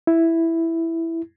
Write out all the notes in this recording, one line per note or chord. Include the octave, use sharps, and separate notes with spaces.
E4